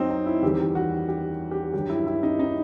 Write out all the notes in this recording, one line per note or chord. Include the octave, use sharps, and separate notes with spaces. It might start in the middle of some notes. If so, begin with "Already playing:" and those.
Already playing: F#2 F#3 C4 D#4
D#4
E4
E2 D#3 G3 G4
F#4
G4
G4
G2 D#3 F#3 G4
E4
E4
D#4
D#4